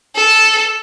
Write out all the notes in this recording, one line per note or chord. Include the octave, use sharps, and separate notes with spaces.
A4